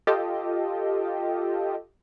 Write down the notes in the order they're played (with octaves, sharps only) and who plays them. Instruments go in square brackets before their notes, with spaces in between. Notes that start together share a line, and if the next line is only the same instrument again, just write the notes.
[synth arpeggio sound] F4 G4 A4 D#5